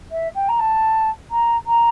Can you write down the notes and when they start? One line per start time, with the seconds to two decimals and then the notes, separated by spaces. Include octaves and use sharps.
0.11 E5
0.34 G5
0.48 A#5
0.59 A5
1.30 A#5
1.66 A#5